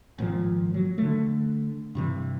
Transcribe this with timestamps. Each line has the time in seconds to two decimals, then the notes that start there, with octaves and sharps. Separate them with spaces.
0.18 G#1 A#2 C#3 F3
0.74 F#3
0.98 D3 A3
1.95 G2 C3 E3